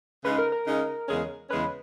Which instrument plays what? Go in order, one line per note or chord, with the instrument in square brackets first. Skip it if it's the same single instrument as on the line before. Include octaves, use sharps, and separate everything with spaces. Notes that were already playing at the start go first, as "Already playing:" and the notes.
[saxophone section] C#3 G#3 D#4 [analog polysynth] B4
[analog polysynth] A#4
A#4
[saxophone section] C#3 G#3 D#4
E2 C#3 G#3 C#4 G#4
[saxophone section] E2 C#3 G#3 C#4 G#4 [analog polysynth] B4